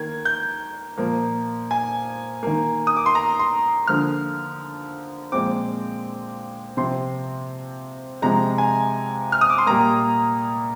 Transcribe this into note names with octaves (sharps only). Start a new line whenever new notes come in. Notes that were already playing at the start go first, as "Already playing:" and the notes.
Already playing: D#3 A#3 G#6
G6
A#2 F3 A#3
G#5
D#3 A#3
D#6
D6
C6
A#5
C6
D3 F3 A#3 F6
A#2 F3 G#3 C4 D6
C3 F3 C4 C6
C3 F3 G#3 A#5
G#5
F6
D#6
D6
C6
A#2 G3 A#3 A#5